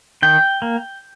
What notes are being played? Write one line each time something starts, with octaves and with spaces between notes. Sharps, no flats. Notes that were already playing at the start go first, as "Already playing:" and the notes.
D#3 G5
A#3